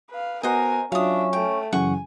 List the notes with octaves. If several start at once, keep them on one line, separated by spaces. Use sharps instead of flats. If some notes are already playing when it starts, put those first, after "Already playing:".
B4 F5
B3 F#4 A#4 C5 D#5 F#5 G#5
F#3 C#4 D4 F4 E5 F5 D#6
A3 G5
F#2 C#3 E3 F#5 G#5 C#6